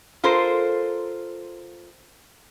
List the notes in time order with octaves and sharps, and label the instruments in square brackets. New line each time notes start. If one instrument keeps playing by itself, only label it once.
[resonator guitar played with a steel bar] F4 A4 A#4 C5